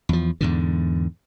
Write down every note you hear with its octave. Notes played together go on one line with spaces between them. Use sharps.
E2 F3
E2 G#2 D3